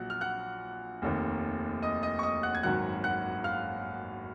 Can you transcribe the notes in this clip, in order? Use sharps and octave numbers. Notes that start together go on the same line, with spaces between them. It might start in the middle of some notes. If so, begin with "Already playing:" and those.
Already playing: A#1 A#2 F#3 F#5 F#6
F6
F#5 F#6
F1 D#2 D#3
D#5 D#6
D#5 D#6
C#6
D#5 D#6
F#5 F#6
G#6
G#1 F#2 D#3 F#3 F#5 F#6
F#5 F#6
F5 F6